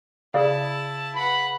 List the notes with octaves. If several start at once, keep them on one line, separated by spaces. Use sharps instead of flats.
C#3 E4 G#4 D5 F5 A5
B4 F#5 B5